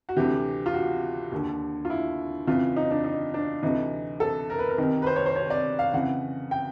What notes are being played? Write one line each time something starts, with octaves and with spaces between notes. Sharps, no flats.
F#4
D2 C3 E3 G4
F4
F#4
D#2 D3
F4
E4
F2 C#3 E3 F4
D#4
D4
D#4
D4
D2 C3 E3 D#4
A4
A#4
B4
A#4
C2 C3 D#3
B4
C5
C#5
C5
C#5
D5
F5
F2 C#3 E3 F#5
G5